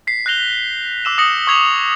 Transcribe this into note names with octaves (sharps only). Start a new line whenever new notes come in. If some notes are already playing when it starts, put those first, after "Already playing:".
B6 C7
F#6 G6 A#6 C7 F7 G7
D6 E6 E7
D#6 A#6 C#7 F#7
C#6 D6 E6 G#6 C7 F7